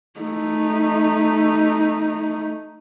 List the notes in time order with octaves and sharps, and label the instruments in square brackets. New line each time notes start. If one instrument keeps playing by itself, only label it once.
[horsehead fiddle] A3 D#4